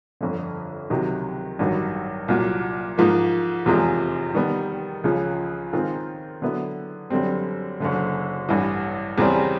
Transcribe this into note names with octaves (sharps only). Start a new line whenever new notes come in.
G1 F2 D3
C#2 C3 D#3 F#3
A1 G2 D#3 F#3
C2 A#2 F#3
G#2 F3 A#3
F1 E2 C3 F3 G#3
D#3 G3 B3
C#2 C#3 F3
D#3 G#3 C4 F4
D3 F#3 B3 E4
F#2 D3 G3 C4
F#1 F#2 D3
A1 G2 E3
E2 C#3 E3 G3 C4